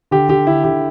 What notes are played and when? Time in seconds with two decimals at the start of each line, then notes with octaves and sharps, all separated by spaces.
0.11 D3 G4
0.29 D3 G4
0.47 D3 E4
0.64 D3 G4